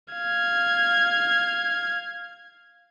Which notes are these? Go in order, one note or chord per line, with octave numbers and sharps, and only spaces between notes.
F5 G#6